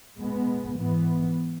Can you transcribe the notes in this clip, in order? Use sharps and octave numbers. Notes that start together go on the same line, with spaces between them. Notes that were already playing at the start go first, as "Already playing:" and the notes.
B2 G#3 B3
G#2 E3 B3